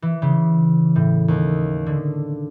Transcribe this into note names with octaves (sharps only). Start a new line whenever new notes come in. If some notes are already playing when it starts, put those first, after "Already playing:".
E3
C#3
A2
D#2
D3